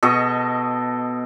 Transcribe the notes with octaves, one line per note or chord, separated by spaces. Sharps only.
B2 A4 D#5 C#6